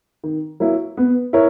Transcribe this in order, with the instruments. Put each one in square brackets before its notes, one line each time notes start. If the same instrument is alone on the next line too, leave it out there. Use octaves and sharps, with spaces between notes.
[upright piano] D#3
F#3 A#3 E4
B3
E4 A#4 C#5